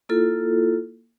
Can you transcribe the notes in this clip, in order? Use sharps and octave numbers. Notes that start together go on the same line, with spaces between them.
A#3 E4 F4 A4